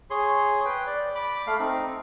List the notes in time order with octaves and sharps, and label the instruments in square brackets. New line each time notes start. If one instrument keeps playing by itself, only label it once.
[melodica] G#4 C#5 C6
B4 G5
D5
B5 D6
A3 F5
C4 D#4